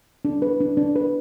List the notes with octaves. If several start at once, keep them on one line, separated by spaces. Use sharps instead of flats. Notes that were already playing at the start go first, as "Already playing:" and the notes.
D4
B4
D4
D4
B4